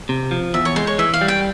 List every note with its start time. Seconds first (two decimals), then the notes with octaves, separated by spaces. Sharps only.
0.09 C3
0.31 F3
0.54 E2 E5
0.65 C#5
0.76 G#3 C5
0.87 C#5
0.98 E3 E5
1.14 F5
1.21 G3
1.28 G5